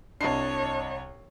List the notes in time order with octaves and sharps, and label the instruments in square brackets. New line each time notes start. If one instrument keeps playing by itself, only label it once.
[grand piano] C2 C7 [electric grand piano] D4 D#5 A5 [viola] C#5